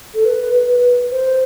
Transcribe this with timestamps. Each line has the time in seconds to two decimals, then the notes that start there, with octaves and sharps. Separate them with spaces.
0.14 A4
0.25 B4
1.11 C5